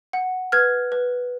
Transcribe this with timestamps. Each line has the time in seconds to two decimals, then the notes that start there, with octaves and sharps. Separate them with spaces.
0.13 F#5
0.52 B4 F6 G#6
0.92 B4